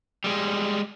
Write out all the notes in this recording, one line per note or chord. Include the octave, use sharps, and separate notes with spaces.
G3 G#3